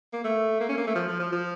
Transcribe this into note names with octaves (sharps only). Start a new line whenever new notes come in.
A#3
A3
A#3
C#4
A#3
A3
F3
F3
F3
F3